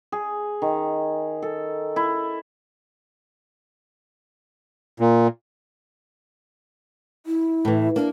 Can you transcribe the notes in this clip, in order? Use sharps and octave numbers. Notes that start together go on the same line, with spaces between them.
G#4
D#3
A4
E4
A#2
E4
A2 E3
A#3 D4